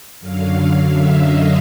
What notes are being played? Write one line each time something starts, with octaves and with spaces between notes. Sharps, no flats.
F#2 D3 F#3 F5
F5
E5
D#5